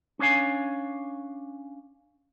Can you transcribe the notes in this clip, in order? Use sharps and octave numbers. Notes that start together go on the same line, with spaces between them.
C#4 D4 C#5 F5 G#5